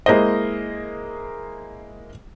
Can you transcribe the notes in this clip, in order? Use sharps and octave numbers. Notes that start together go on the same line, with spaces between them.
G#3 A#3 E4 C5 D#5